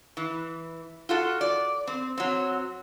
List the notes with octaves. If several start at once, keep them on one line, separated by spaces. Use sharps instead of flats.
E3
F4 F#4 A4
D5
C4
F#3 C4